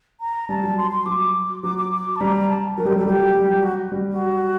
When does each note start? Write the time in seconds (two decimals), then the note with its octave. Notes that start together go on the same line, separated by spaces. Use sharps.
0.21 A#5
0.49 G3 A5
0.63 F#3
0.78 C6
0.91 C6
1.06 F#3 D6
1.63 F#3 D6
1.78 D6
1.92 D6
2.16 A5
2.21 G3 A#5
2.49 A5
2.78 F#3 A#4
2.85 G3 G4
2.93 F#3 A#4
2.97 G3 A4
3.06 F#3 G4
3.35 G3
3.49 F#3
3.63 F#4
3.92 G3
4.11 F#4